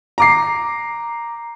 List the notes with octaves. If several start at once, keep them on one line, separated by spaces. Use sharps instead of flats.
A#5 D6 C7